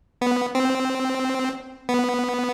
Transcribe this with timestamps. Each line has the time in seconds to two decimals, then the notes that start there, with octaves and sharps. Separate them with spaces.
0.21 B3
0.55 C4
1.89 B3